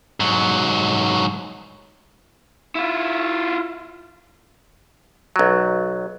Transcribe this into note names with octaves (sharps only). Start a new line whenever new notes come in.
G#2 F#3
E4 F4
B1 F#3